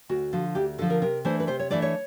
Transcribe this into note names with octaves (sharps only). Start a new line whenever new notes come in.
D2 F#4
D3 F3
D2 G4
D3 F3 A4
A#4
C3 A#4
E3 A3 D4 C5
B4
C3 C5
C#5
E3 A3 D4 D5
C#5